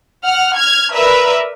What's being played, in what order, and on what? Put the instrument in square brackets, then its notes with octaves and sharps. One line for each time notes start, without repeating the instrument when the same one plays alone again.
[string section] F#5 F6
F6 G#6
A#4 B4 D5 E5 E6